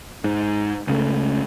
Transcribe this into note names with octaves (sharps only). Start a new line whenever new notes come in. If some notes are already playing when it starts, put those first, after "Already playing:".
G#2
C#2 C#3 A3